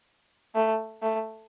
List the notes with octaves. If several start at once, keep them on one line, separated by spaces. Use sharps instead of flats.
A3
A3